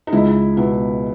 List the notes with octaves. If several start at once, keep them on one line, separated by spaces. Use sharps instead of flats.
D#4
C#2 E4
B2 E4